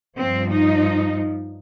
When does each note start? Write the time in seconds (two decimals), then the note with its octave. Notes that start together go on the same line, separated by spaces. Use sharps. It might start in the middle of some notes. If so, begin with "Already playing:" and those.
0.17 G2 F3 C4
0.52 D#4